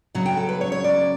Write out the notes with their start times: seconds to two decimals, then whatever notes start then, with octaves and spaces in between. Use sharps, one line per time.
0.15 F#2 C#3 F#3
0.26 G5
0.37 A4
0.49 B4
0.61 C#5
0.72 C#5
0.84 D5